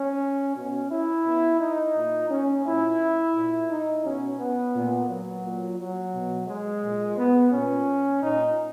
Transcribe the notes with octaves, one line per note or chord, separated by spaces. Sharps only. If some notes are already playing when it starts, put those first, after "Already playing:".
Already playing: C#4
B2 C#4
E4
B2
D#4
A#2
C#4
A#2 E4
A#2
D#4
B2 C#4
B3
A#2
F#3
A#2
F#3
B2
G#3
A#2
B3
A#2 C#4
A#2 D#4